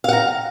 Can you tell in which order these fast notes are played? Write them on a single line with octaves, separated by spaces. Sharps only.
F5 F#5 A#5